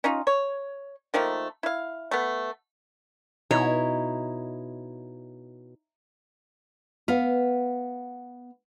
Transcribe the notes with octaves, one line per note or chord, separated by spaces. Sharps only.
C#4 D#4 F4
C#5
D#3 F3 A3 A#3
E4 F5
A3 B3
B2 D#4 E4 C#5
B3 F5